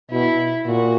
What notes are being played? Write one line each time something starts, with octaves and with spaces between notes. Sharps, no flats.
B2 E4
A#2 F#4